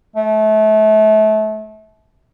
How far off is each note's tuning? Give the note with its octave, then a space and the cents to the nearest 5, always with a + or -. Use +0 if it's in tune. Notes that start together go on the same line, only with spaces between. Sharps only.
A3 -30